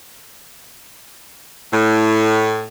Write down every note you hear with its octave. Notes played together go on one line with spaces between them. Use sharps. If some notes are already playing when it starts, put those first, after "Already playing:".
A2